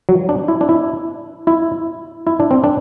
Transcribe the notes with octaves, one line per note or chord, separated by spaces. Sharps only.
F#3
D4
E4
D4
E4
E4
E4
D4
C4
D4